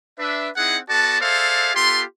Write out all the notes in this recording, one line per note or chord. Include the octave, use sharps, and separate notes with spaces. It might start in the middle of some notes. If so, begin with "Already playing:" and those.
D4 B4 E5
C4 D#4 E4 G#4 F#5
B3 F#4 A4 D5 A5
G#4 A4 C5 D5 E5 F5
B3 F4 G4 A4 C6